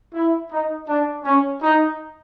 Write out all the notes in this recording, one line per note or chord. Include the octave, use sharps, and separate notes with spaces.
E4
D#4
D4
C#4
D#4